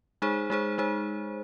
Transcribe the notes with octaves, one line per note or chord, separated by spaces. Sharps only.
G#3 D#4 G#4 C5
G#3 D#4 G#4 C5
G#3 D#4 G#4 C5